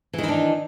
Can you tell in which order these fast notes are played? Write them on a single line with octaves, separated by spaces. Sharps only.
E3 D#3 D#4 D4